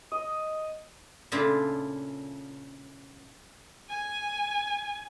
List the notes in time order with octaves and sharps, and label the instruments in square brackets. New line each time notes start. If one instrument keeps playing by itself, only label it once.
[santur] D#5
[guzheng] A#2 C#3 D4 E4 F4 A4
[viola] G#5